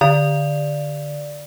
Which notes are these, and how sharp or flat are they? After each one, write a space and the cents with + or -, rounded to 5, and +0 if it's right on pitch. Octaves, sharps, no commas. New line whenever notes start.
D3 +0 D5 +0